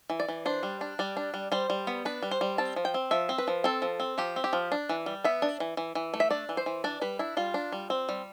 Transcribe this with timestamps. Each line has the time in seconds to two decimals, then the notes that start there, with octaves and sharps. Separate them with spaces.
0.10 E3
0.20 D5
0.28 E3
0.46 D4 C5
0.63 G3
0.81 D4
0.99 G3 D5
1.17 D4
1.34 G3
1.52 G3 C5
1.70 G3
1.87 B3
2.05 D4 B4
2.22 G3
2.31 C5
2.41 G3
2.58 C4 A5
2.76 F3
2.85 G5
2.94 C4
3.11 F3 E5
3.29 C4
3.38 B4
3.48 F3
3.64 C4 A4
3.82 F3
4.00 C4
4.18 F3 G4
4.36 C4
4.44 G4
4.53 F3
4.72 D4
4.89 E3
5.06 G3
5.24 B3 E5
5.42 D4
5.60 E3
5.77 E3
5.95 E3
6.14 A3
6.20 E5
6.31 D4 D5
6.49 E3
6.57 C5
6.66 E3
6.84 D4 D5
7.01 G3 B4
7.19 D4 E4
7.37 G3 F4
7.54 D4
7.72 G3
7.90 C4
8.09 G3